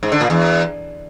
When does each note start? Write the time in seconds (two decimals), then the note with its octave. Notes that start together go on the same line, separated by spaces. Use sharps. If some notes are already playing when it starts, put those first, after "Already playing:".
0.03 G#2
0.12 D3
0.21 A#2
0.30 E2